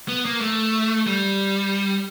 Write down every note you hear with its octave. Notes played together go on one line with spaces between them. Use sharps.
B3
A#3
A3
G3